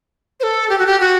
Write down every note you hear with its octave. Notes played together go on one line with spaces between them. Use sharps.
C5
A4
G4
F#4
G4
F#4